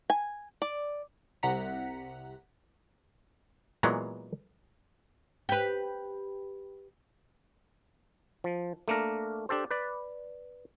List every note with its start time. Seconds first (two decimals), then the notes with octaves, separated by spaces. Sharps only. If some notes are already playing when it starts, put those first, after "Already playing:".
0.10 G#5
0.62 D5
1.43 C2 C3 F#5 A#5 B6
3.83 A#2 E3 F#3 G#3 B3
5.49 G4 B4
8.44 F3
8.88 A3 A#3 D4 A#4
9.49 D4 G4 A4 C5
9.71 B4 D5